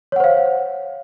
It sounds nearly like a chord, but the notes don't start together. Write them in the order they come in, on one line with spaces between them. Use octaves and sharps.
C#5 F#5 C5 F5